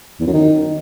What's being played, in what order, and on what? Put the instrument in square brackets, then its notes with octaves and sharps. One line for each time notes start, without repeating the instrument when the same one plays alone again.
[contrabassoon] E2
F#2
D#3